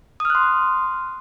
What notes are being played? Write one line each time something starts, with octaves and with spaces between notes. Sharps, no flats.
C6 D#6 F6 F#6